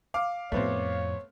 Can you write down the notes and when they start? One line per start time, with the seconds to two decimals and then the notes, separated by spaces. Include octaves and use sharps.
0.14 F5 D6
0.52 F2 A2 A3 B3 C4 C#5